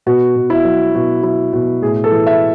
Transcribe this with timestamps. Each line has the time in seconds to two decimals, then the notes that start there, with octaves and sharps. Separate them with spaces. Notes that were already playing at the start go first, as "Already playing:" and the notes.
0.06 B2 F#4
0.36 B2
0.50 E4
0.65 F#3
0.95 B2 F#4
1.23 F#3 E4
1.53 B2 F#4
1.82 A2 G#4
2.04 A4
2.11 E3
2.27 E5